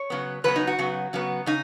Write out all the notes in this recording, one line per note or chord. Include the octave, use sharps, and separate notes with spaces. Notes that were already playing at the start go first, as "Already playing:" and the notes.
Already playing: C#5
C#3 F#3 B3
C#3 F#3 B3 B4
D#4
F#4
C#3 F#3 B3
C#3 F#3 B3
C#3 D#4